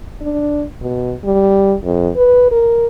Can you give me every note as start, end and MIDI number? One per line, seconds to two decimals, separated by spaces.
0.21 0.64 62
0.82 1.13 47
1.24 1.74 55
1.83 2.10 41
2.16 2.51 71
2.51 2.87 70